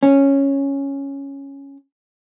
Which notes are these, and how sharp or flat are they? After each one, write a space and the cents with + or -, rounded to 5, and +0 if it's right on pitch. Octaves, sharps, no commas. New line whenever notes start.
C#4 -5